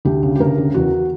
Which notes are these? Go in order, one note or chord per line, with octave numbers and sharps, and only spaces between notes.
D2 G4
C#3
G4
D2 A#4
C#3
E2 F#4